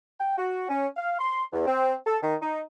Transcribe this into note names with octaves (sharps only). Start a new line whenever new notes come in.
G5
F#4
C#4
F5
C6
E2
C4
A4
D#3
D#4